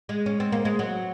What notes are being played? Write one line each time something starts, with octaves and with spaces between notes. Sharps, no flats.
G#3
C#4
C4
A#3
G#3
F#3